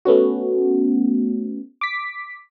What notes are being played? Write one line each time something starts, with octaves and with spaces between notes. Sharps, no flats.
A3 B3 C#4 F#4
D6 B6